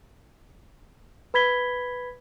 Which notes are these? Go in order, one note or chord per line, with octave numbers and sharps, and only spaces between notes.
B4 B5 G#6 B6 G7